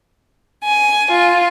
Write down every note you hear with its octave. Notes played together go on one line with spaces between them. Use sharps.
G#5
F4